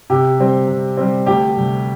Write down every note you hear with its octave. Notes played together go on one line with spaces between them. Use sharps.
C3 G4
G3 C4
C3
G3 C4
D2 G4
C3 G3